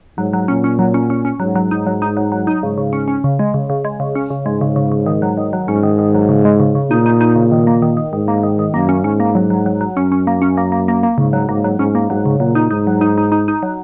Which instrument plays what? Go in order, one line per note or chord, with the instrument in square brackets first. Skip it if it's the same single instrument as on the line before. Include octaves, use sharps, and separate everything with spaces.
[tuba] G#2 [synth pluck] F#3
[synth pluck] F#3
[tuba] A#2 [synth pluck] C#4
[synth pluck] C#4
F#3
C#4
C#4
C#4
[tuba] G#2 [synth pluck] F#3
[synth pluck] F#3
D#4
F#3
D#4
F#3
F#3
D#4
[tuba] G#2 [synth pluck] C#3
[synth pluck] C#3
C#4
C#4
C#3
G#3
C#3
C#3
G#3
C#3
C#4
C#3
[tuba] G#2 [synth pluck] G#3
[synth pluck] C#3
C#3
C#3
D#3
F#3
D#3
F#3
[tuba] G#2 [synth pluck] C#4
[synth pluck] D#3
D#3
F#3
C#3
G#3
C#3
C#3
[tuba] A#2 [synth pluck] D#4
[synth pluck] D#4
D#4
C#3
D#3
A#3
D#3
D#3
[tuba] G#2 [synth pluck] D#3
[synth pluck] A#3
D#3
D#3
[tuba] F#2 [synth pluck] A#3
[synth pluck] C#4
[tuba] G#2 [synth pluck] C#4
[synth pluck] A#3
F#3
F#3
F#3
F#3
[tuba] F#2 [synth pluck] C#4
[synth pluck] C#4
A#3
C#4
A#3
A#3
A#3
A#3
[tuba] G#2 [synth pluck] C#3
[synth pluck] F#3
[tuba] G#2 [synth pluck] A#3
[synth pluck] F#3
[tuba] G#2 [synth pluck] C#4
[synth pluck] A#3
[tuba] G#2 [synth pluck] F#3
[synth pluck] C#3
[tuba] A#2 [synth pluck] F#3
[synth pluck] D#4
[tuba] G#2 [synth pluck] D#4
[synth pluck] F#3
D#4
D#4
D#4
D#4
F#3